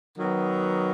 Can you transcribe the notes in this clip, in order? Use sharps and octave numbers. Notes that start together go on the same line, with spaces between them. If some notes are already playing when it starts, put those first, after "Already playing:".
D#3 F#3 B3